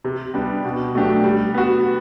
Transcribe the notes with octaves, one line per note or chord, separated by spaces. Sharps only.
C3
G3 B3 D4 G4
B2
F#3 A3 D4 G4
G3
B3 F#4